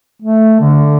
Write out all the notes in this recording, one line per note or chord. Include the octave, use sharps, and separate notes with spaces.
A3
D3